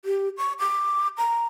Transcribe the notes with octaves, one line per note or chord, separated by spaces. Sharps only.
G4
C#6
D6
A#5